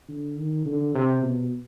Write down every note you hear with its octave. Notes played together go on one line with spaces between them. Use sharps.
D3
D#3
D3
C3
B2